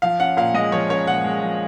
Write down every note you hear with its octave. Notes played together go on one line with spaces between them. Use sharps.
F3 F5
C#4 F#5
A#2 F5
G#3 D#5
F3 C#5
C#4 C#5
A#2 F#5
G#3
F3